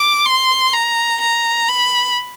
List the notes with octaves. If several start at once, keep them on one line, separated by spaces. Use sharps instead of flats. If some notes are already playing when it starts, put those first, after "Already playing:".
Already playing: D6
C6
A#5
A#5
B5